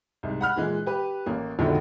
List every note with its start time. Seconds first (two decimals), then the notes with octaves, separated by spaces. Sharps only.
0.23 C2 G#2
0.41 F#5 B5 F6 F#6
0.56 A#2 E3 G#3
0.86 G4 B4 B5
1.26 A1 A#3
1.59 F1 A#1 G#2 B2 D3 D#3